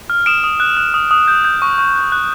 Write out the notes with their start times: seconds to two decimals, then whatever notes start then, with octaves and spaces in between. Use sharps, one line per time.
0.10 F6
0.26 D#6 D7 E7
0.44 D#6
0.60 F#6
0.77 F#6
0.94 D#6
1.11 D#6
1.28 G6
1.45 G6
1.62 C#6
1.78 C#6
1.96 F#6
2.12 F#6